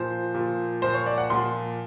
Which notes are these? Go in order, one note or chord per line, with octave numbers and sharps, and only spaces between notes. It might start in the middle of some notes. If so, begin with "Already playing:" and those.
Already playing: A#2 F3 C5
A#2 F3
A#2 F3 C5
C#5
D5
F#5
A#2 F3 C6